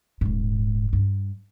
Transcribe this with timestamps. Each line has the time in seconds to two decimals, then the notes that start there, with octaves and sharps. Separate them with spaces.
0.21 D#1 G#2
0.93 G2